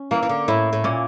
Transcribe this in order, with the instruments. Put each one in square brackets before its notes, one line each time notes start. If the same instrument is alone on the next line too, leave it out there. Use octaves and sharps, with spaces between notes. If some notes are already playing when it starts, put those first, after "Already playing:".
Already playing: [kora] C#4
[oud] E3 [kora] A#3
[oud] E3
D3
[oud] A2 [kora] E4
[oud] A2
[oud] A#2 [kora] C#4